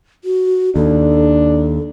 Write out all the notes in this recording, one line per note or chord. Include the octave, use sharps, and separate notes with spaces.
F#4
D#2 D4 A4